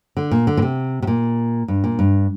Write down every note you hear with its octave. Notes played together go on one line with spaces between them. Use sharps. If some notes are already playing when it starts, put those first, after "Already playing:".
D3
A#2
D3
A#2
C3
C3
A#2
G2
A#2
G2